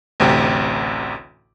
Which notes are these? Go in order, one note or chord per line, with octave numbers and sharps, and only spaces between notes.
A1 D2 C3 G4